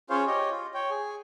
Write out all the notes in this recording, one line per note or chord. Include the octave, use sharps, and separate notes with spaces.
C#4 F4 G#4 C5 C#5 F5
G4 C#5 D#5
F4
C#5 G5
G#4 G#5